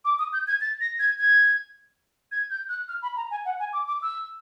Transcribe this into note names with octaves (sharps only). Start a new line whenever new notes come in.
D6
D#6
G6
G#6
A6
A#6
G#6
G#6
G#6
G6
F#6
F6
B5
A#5
G#5
F#5
G#5
D6
D6
E6